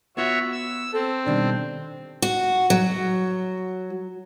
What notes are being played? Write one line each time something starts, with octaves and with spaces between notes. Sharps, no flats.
B3 F4 F#4 C#5 E5 F#5
E6
C4 A4
B2 D#3 G3 D4
F#4
F#3